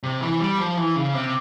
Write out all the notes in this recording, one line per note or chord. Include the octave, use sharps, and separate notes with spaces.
C3
E3
G3
F3
E3
C#3
C3